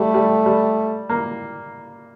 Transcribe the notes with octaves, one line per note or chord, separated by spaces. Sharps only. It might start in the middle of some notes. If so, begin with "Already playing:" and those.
Already playing: G3 A3
G3
G3
A#3